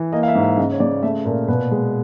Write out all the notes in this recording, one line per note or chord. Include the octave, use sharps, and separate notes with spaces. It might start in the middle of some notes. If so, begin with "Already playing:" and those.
Already playing: E3
A#3 D#5
F5
E5
G#2
E5
C#3 D#5
C#5
C#3 D5
A3 E5
A#2 A#4
B2 B4
G#3